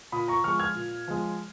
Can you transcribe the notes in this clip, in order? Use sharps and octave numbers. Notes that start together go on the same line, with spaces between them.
A#2 B5 D#6
A#5 C#6
F3 G#3 C#6 F6
F6 G#6
A#2
F3 G#3